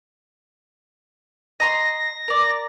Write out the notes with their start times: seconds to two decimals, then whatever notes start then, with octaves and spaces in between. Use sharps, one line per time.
1.60 D#5 A#5 C6 A#6
2.28 A#4 D5